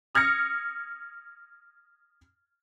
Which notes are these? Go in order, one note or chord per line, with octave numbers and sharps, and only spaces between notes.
D#6 F6 G#6 A#6 C#7